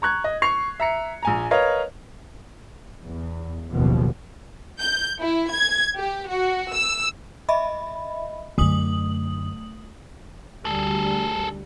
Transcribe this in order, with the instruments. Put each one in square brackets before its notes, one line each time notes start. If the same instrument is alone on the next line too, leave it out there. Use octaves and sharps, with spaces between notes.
[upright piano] A#5 C#6 F#6 G#6
D#5
C#6 C7 F7
E5 A#5 C#7
A#1 G#5 A#5
A#4 B4 C#5 D#5 F5
[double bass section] E2
F#1 D#2 B2 F3
[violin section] G6
E4
G#6
G4
F#4
E6
[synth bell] D#5 E5 B5
[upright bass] F#2 D3 [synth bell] A3 D#6 F#7
[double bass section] D2 G3 [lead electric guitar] G#4 A4